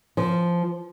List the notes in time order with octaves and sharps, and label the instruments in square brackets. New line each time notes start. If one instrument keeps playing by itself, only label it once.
[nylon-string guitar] F3